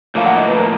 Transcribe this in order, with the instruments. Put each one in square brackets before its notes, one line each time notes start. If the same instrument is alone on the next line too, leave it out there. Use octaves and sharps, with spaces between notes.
[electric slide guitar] A2 F3 A#3 [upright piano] F5
[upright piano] F#5
D#5
B4
A#4